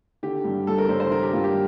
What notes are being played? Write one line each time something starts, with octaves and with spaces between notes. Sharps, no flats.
D3 G4
G2
G3 A4
A#4
G2 C5
C5
D3 A#4
G4
G2 F4
G4